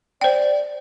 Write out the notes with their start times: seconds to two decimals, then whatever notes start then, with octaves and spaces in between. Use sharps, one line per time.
0.21 C5 D5 G5